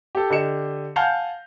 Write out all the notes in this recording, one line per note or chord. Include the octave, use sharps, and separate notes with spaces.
G4 A4
D3 G4 D#5 C#7 E7
F5 F#5 G#5 A5 F6 G6